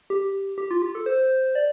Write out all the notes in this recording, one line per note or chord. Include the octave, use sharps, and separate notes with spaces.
G4
G4
F4
G4
A4
C5
D5